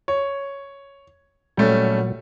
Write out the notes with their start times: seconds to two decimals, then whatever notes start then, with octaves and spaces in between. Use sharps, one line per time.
0.08 C#5
1.57 A#2 F#3 G3 A3 C#4